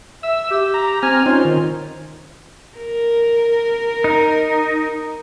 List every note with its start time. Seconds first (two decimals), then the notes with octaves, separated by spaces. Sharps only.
0.23 E5 E6
0.51 G4
0.74 A#5
1.03 C4 G#5 F6
1.26 C#4 D#4 F4 C5
1.45 D#3
2.77 A#4
4.04 D#4